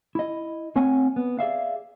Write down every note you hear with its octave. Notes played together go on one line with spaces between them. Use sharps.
E4 D#5
A3 C4 A#4 C#5 F#5 G#5
B3
G#4 D5 E5 F5